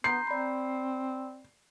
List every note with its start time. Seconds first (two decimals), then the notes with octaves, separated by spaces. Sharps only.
0.04 B3 A#5 C6 G6 C7
0.27 C4 D5 B5